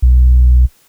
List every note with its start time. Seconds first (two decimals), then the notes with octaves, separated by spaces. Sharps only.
0.02 B1